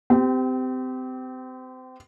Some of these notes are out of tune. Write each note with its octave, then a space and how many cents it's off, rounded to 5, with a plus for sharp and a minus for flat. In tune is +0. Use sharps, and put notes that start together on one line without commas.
C4 -30 G4 +0